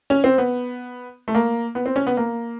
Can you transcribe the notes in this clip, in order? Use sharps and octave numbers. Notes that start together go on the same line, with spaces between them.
C#4
C4
B3
A3
A#3
B3
C4
C#4
B3
A#3